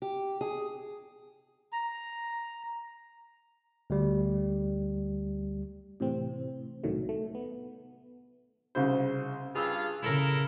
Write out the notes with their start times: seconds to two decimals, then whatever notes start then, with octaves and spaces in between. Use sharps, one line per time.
0.02 G4
0.41 G#4
1.72 A#5
3.90 D2 G3
6.00 A2 C3 E3 C4
6.84 C2 A2 D#3 F#3 A3
7.09 A3
7.35 B3
8.75 C2 C#3 C5
9.55 G2 F4 G#4 E6
10.03 C#3 E4 A4 A#4